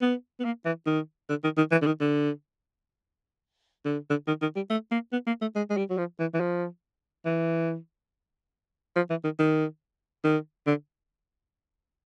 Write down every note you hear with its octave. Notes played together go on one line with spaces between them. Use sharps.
B3
B3
A#3
E3
D#3
D3
D#3
D#3
E3
D3
D#3
D3
D3
D3
D#3
D#3
G3
A3
A#3
B3
A#3
A3
G#3
G#3
G3
F#3
F3
E3
E3
F3
E3
F3
E3
D#3
D#3
D#3
D3